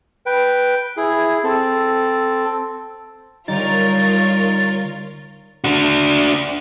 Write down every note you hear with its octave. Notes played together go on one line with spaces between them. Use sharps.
B4 G5
E4 G#4
C4 A4
D3 G3 D#4 F4 A#4 C#5 A6
D4 F#4